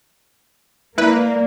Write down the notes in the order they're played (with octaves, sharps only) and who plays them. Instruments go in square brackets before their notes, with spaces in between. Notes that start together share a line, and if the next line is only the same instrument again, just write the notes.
[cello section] A#3 [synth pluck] E4 B4 [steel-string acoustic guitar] D5